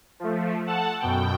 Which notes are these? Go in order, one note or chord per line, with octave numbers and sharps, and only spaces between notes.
F3 A3
A4 F#5 A5
F#2 B2 G5